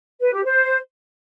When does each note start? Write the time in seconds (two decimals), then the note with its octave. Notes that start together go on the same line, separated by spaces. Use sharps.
0.20 B4
0.32 G4
0.44 C5